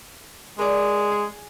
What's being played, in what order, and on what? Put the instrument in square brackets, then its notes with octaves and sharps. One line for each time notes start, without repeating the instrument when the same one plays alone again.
[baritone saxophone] G#3 [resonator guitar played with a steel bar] A#4 D5
[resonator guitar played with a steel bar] G#4